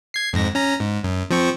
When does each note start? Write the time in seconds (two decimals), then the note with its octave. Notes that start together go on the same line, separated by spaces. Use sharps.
0.14 G#6 C7
0.33 F2 G#2 A#6
0.55 C#4 A#5 A#6
0.80 G#2
1.04 F#2
1.31 F3 C4 C#6